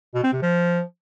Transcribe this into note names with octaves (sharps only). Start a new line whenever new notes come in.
B2
C4
C3
F3